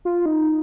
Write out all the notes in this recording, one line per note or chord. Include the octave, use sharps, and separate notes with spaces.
F4
D#4